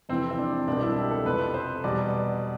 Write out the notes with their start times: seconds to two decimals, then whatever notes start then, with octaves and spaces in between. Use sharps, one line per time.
0.09 F2 C3 E3 C4
0.31 C4
0.39 D4
0.67 C2 B2 G3 D4
0.83 E4
0.96 G4
1.11 A4
1.25 F2 C3 F3 B4
1.54 C5
1.84 E2 B2 G3 D5